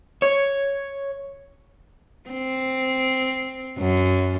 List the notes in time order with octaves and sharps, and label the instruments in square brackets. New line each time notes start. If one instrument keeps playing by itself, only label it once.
[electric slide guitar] C#5
[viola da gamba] C4
F#2